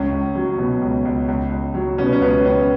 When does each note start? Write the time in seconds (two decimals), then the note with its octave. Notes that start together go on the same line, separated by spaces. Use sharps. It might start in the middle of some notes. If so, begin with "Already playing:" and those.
Already playing: C#2 C#4
0.12 C#2
0.36 F#3
0.58 B2
0.82 C#2
1.05 C#2
1.28 C#2
1.51 C#2
1.75 F#3
1.98 B2 C#4
2.06 B3
2.13 C#4
2.22 C#2 B3
2.45 C#2 C#4